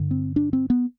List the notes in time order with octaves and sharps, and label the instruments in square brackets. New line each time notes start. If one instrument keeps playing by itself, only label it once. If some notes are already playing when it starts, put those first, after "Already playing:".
Already playing: [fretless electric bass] G2 D3
C4
D4
C4
B3